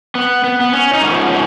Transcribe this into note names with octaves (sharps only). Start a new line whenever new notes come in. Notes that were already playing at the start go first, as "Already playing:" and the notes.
B3
B3
B3
C#4
D#4
G#2 F3 B3 C#4
C#4